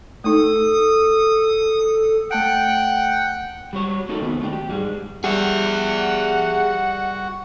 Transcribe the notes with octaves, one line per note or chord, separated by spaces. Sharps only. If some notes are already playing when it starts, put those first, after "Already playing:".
A3 D#4 A4 D#6
A3 F#5 G5 A5 D7
G3 F#4 C#5
A#3 D#4 F#4 A4
D#3 F3 B3
D#3 A3 D4 G5
G4
G#2 G3 G#3
G3 F#4 G#4 E5 F#5